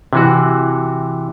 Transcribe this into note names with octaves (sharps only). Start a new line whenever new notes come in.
C3 E3 F#4